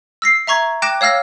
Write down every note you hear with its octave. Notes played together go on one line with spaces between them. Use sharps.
E6 A#6 C7
E5 A#5 C#6 G#6
G5 D6 F#6 A#6 E7
C#5 F5 E6 F6 A#6